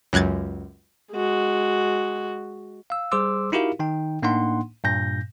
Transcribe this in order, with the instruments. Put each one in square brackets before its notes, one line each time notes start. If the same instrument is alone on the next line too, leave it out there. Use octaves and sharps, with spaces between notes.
[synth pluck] C#2 F#2 F#6 G#6 A6
[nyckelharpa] G#3 F#4
[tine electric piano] F5 E6
G3 G#4 C5 C6 D6 E6
D#4 E4 F#4 G4 A#4 F5
D#3 D#4 G5
A2 A#3 D4 D#4 F#5 C6
G2 A#2 G6 A#6